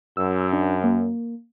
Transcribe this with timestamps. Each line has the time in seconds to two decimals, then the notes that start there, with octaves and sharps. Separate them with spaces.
0.17 F#2 E6
0.53 D4
0.84 A#3